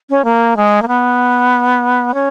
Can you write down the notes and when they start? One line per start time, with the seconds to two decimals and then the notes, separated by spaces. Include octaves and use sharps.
0.10 C#4
0.24 A#3
0.57 G#3
0.82 A#3
0.88 B3
2.14 C#4